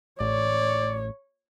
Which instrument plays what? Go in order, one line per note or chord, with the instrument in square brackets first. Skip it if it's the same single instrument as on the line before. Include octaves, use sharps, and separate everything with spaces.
[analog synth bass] A1 [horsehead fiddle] C#5 [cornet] D5